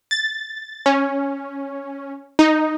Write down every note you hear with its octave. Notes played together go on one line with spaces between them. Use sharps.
A6
C#4
D#4